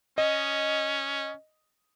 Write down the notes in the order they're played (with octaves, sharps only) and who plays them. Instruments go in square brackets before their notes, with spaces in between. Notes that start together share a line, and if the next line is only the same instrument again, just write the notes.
[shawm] C#4 [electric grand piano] D#5